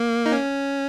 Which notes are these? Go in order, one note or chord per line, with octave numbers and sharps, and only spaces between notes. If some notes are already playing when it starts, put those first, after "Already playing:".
Already playing: A#3
D#4
C#4